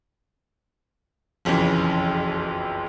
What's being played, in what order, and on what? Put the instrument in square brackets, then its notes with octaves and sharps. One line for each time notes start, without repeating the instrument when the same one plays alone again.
[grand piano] F#1 B1 F2 C#3 E3